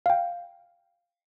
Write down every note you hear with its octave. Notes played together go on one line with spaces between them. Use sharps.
F5 G5